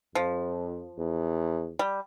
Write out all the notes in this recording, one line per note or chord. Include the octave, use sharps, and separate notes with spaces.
F2 F3
E2
G3